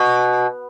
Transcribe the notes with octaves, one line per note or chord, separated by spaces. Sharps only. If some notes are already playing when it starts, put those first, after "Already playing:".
Already playing: B2